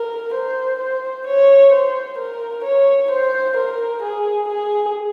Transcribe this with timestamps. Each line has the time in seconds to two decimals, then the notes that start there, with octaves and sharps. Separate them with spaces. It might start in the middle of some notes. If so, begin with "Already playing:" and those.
Already playing: A#4
0.34 C5
0.79 C5
1.26 C#5
1.72 C5
2.18 A#4
2.64 C#5
3.10 C5
3.56 A#4
4.02 G#4
4.47 G#4